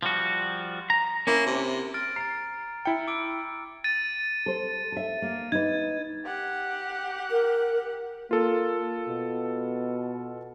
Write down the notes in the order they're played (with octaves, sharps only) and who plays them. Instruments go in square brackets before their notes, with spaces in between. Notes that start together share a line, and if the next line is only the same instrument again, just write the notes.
[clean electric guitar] F3 G3 F#4
A#5
[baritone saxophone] A#3 [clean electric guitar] C#4 E4
[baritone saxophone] C3
[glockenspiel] F6 A6 D7
[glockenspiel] A#5 A6 [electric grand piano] C7
[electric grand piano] E4 G5 [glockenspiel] C#7
[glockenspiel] D6 E6 D7
[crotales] A6 D#7
[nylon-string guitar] A4 C5
A4 E5
A#3
[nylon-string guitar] D#4 B4 [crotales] G#6
[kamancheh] G4 F#5
[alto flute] A#4
[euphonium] A#3 [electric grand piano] F4 A4
[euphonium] B2